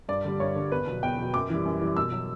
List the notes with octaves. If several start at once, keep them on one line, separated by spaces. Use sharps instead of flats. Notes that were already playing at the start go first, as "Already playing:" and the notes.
G2 D5
D3 G3
G2 C#5
D3 G3
E2 B4
B2 F#3
E2 G5
B2 F#3
F#2 D6
E3 G3
F#2
E3 G3
B2 E6
F#3